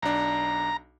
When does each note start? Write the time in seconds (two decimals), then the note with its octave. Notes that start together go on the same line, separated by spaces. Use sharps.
0.02 B1 D4 A#5